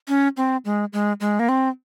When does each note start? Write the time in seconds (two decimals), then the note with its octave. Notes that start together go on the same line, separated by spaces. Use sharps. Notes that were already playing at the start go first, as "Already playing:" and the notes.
0.08 C#4
0.37 C4
0.65 G#3
0.93 G#3
1.20 G#3
1.39 A#3
1.49 C4